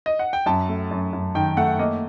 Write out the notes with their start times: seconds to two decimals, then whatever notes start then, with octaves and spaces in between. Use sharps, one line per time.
0.06 D#5
0.19 F#5
0.33 G5
0.46 F#2 A5
0.69 A3
0.91 F#2
1.13 F#2
1.35 D#3 G5
1.57 A3 F#5
1.79 A#3 D#5